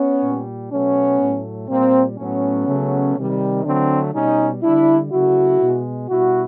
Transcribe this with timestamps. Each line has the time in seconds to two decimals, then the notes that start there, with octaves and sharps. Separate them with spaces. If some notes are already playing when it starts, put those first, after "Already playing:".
Already playing: B3 C#4
0.23 A#2 G3
0.72 B2 F#3 A3 B3 C#4
1.21 A2 F#3 A3
1.69 A#2 G3 A#3 C4
2.18 A2 F#3 A3 B3 C#4
2.67 C#3 F#3 A3
3.17 C3 D#3 G3
3.65 D3 F#3 A3 C4 D4
4.13 B2 G3 C#4 D#4
4.63 D3 G3 D4 E4
5.12 C#3 F#3 A3 E4 F#4
5.61 B2 G#3
6.09 B2 G3 E4 F#4